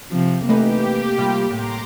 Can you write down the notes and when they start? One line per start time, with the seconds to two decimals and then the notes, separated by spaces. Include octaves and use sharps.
0.12 C3 F3
0.49 E3 A3 A#3 D#4 G4 B4
1.18 C3 G3 F4
1.51 A2 A#5 C6 D6